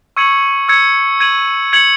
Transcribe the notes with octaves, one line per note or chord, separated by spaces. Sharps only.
C#6 E6 G#6 C#7 F#7
E6 G#6 C#7
G#6 D#7 F#7
G#6 C#7 F#7